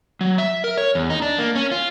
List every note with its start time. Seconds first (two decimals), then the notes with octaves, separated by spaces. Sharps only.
0.21 F#3
0.38 E5
0.64 A#4
0.78 C#5
0.95 E2
1.10 D#4
1.22 D4
1.39 A#3
1.55 C#4
1.72 F4